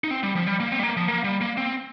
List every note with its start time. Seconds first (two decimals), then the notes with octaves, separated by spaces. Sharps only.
0.04 D#4
0.11 C4
0.23 G3
0.35 F3
0.47 G3
0.60 A#3
0.72 C4
0.79 G3
0.83 A#3
0.97 F3
1.08 A#3
1.24 G3
1.41 A#3
1.57 C4